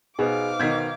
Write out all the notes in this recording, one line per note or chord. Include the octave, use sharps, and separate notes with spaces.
B2 D#4 G#4 B4 C5 F5 D6
B2 D#3 G6 G#6 B6